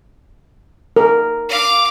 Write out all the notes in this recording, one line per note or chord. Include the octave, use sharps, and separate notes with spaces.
A#4
F5 D6